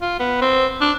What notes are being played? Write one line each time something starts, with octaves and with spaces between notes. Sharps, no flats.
F4
B3
C4
D4